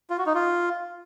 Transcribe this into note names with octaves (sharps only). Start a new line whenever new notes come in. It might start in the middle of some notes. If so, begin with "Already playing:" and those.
F4
F#4
D#4
F4